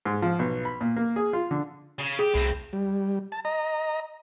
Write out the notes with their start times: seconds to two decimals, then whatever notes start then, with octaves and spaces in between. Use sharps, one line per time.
0.05 G#2
0.22 F3
0.39 B1
0.65 B5
0.81 A#2
0.96 A#3
1.16 G#4
1.33 F4
1.51 D3
1.99 C#3
2.19 G4 G#4
2.35 C2 A2 C4
2.73 G3
3.32 A5
3.45 D#5 A#5